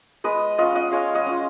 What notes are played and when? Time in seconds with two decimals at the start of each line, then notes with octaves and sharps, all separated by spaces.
0.24 G#3 B4 D#5
0.58 C#4 F4 D#5 F#5
0.75 D#5 F#5
0.92 G#3 C#5 F5
1.14 D#5 F#5
1.26 C#4 F4